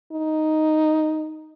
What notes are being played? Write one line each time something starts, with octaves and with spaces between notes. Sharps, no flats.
D#4